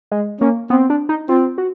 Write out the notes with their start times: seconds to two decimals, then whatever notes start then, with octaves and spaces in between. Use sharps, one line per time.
0.12 G#3
0.40 A#3 C#4
0.70 B3 C4
0.90 D4
1.09 D#4
1.29 C4 F4
1.58 F#4